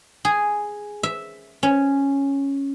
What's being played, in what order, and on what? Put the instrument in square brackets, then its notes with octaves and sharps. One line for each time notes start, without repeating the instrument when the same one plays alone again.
[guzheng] G#4
E5
C#4